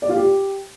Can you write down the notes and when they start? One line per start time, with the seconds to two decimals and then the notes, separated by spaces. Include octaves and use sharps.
0.02 D5
0.09 F4
0.16 G4